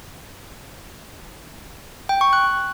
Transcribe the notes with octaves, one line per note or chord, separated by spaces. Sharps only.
G5
C#6
F#6